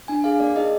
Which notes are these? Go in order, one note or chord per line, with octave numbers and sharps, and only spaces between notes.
D4 G#5
G#4 F5
A#3 D5
D#4 G#4 D#5